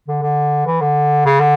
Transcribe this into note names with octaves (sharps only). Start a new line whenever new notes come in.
D3
D3
E3
D3
C#3
D3